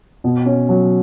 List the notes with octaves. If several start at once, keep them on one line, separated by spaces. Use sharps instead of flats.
B2
C#4
F#3